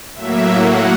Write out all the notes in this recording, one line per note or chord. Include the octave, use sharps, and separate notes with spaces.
A2 F#3 A#3 E5
F#5